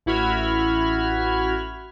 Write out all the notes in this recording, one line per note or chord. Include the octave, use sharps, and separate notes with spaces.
A1 E4 F#4 B5 F6 G#6